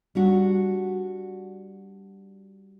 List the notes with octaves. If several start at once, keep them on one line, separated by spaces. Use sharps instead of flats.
G3 D4 F#4